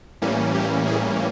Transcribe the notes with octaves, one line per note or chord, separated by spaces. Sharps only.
A2 E3 G3 A#3 C#4
G4
G#4